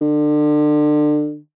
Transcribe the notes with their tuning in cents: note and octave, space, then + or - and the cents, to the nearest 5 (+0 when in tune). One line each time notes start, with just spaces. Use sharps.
D3 +30